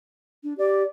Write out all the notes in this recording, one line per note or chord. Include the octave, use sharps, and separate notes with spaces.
D4
G4 D5